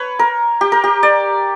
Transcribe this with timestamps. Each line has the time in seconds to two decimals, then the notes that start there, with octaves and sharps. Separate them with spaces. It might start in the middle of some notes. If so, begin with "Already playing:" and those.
Already playing: B4 C#5
0.19 A#4
0.61 G4
0.72 A#4
0.84 G4
1.03 D5